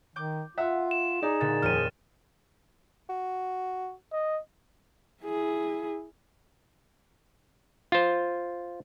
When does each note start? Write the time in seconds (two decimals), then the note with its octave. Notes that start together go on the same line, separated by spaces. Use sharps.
0.16 D#3 D6 G6
0.58 F4 E5 F#5
0.91 E7
1.22 D#4 G#4 D5
1.41 A#2 D3 A6
1.62 D#1 F2 F6 D#7 E7
3.09 F#4
4.13 D#5
5.24 E4 G#4
7.92 F4 C5